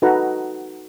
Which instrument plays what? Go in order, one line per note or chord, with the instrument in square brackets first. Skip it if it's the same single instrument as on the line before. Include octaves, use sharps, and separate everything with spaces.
[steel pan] D#4 F#4 A4 B4 F#5 A#5